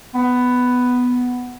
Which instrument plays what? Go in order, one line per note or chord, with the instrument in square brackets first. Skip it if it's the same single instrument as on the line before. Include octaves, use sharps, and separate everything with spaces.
[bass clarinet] B3